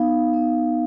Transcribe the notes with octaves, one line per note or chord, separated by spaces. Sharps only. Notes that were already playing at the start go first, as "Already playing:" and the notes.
Already playing: B3 D#4 F5
B3